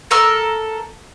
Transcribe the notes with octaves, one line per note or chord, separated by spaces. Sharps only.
A4 A#4 E6 F6